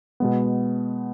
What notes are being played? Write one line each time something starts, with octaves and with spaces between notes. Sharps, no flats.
B2 G#3 B3